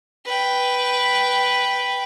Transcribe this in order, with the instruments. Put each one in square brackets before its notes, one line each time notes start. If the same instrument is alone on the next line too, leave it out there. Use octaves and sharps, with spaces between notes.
[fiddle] B4 G5